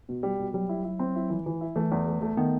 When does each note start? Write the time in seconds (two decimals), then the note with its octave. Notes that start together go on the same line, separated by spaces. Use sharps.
0.09 B2
0.23 G3
0.39 B2
0.54 F#3 G3
0.69 E4
0.84 E4
0.99 C4
1.16 E4
1.30 E3
1.46 E3
1.61 E4
1.76 E3 A3
1.92 E2
2.06 A3
2.22 A3
2.37 D#3 B3